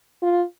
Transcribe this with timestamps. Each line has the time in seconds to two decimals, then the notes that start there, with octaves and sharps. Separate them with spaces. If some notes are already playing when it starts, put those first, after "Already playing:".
0.22 F4